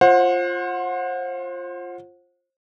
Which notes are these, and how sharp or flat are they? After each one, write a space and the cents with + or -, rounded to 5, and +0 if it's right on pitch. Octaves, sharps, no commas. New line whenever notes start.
F4 +0 C5 +30 F#5 -25